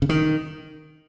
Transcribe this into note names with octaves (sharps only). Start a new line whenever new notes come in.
C#3
D#3